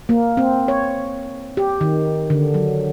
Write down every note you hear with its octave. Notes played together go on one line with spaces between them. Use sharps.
A#3
C4
C#5
G4
D#3
D3
F#3